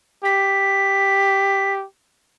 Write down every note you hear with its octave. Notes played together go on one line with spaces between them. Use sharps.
G4 B6